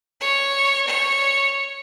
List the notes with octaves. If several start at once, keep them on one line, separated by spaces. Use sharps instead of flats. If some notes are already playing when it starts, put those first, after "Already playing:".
C#5
C#5